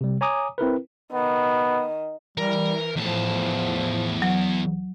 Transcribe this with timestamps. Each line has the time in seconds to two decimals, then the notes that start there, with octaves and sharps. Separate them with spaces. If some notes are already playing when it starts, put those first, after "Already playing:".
0.01 C3 G3
0.21 C#5 G#5 A#5 D6 D#6
0.58 C4 E4 A#4 B4
1.13 D#3 B3
2.38 E3 G3 A#4
2.97 E2 A2 F3 A5
4.22 F#3